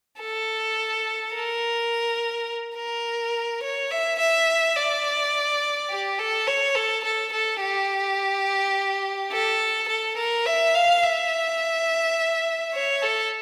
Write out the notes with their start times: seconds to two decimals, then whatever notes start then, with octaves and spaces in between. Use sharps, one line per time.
0.21 A4
1.34 A#4
2.76 A#4
3.63 C#5
3.91 E5
4.20 E5
4.76 D5
5.90 G4
6.19 A4
6.47 C#5
6.75 A4
7.04 A4
7.33 A4
7.61 G4
9.32 A4
9.88 A4
10.17 A#4
10.46 E5
10.75 F5
11.03 E5
12.73 C#5
13.02 A4